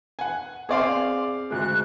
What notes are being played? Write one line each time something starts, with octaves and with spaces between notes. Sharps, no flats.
F#5 G#5
C4 G#4 D5 F5 C6
D2 G#3 F#6